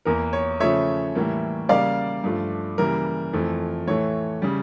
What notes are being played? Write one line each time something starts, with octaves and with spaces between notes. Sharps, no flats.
E2 E3 A#3 A#4
C#5
C#3 F3 A3 C#5 E5
A2 E3 G3 A#3
C#3 G3 A#3 D5 F5
G2 F3 A3
C#3 E3 G3 A#3 A#4
F2 E3 A3
A2 E3 A3 C#5
C#3 G3